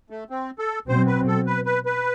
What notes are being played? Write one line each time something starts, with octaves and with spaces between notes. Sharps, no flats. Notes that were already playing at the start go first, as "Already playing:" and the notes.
A3
C4
A4
B2 F#3 C4 C5
B4
A4
B4
B4
B4